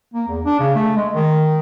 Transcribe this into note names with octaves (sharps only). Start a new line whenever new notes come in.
A#3
E2
D4
C#3
A3
G#3
D#3